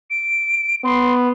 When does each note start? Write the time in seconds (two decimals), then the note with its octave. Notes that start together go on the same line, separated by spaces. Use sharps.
0.10 D7
0.84 B3 C6